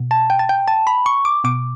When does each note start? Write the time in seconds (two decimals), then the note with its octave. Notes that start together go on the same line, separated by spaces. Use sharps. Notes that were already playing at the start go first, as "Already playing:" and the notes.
Already playing: B2
0.11 A5
0.30 G5
0.39 A5
0.49 G5
0.68 A5
0.87 B5
1.06 C#6
1.25 D6
1.44 B2 D6